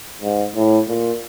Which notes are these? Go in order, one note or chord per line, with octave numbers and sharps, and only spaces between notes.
G#2
A2
A#2